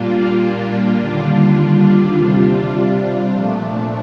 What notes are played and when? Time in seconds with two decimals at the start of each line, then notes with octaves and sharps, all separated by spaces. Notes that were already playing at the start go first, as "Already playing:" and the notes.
Already playing: A#2 G3 A#3 D4 F4
0.99 D#2 D3 G3 D4 F4
2.16 C3 G3 D4 F4
3.34 A#2 F3 A3 D4